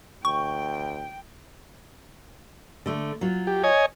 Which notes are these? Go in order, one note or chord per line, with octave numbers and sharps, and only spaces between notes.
D2 G5 C#6
D3 A3
F#3 F4
G4
C#5 D#5 G#5